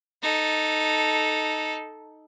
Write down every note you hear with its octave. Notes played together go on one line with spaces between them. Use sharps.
D#4 A4